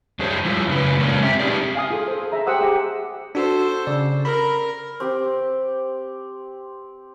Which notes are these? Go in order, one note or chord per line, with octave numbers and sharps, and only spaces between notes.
F#2 D4 G#4 C5 C#5
F3 G3 E4
F#2 C#3 B4
C#3 F3 G#3 A#3 C#4 D4
C4 E5
D4 D#4 G4 G#4 D5
F5 G#5 D#6
F4 G#4 A4
A4 C5
G#4 E5 A#5
G4 C5 F#5 D#6 E6
G4 G#4 E5 A#5
D4 F#4 A4 C5
C#3 D5
A#4 B5
C4 G4 G5